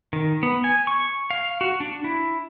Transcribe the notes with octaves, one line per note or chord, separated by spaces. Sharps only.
D#3
B3
G#5
C#6
F5
F#4
D4
E4